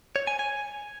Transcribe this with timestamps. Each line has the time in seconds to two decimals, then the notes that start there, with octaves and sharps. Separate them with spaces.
0.16 C#5
0.27 G#5
0.39 G#5